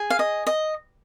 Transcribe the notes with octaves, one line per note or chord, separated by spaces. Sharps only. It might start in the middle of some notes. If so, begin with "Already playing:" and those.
Already playing: G#4
F5
D#5
D#5